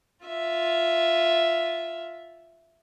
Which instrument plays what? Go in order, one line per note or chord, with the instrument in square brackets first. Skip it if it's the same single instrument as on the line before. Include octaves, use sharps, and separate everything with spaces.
[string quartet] F4 E5